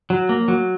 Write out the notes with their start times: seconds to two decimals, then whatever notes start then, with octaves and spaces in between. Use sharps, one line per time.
0.10 F#3
0.29 A#3
0.48 F#3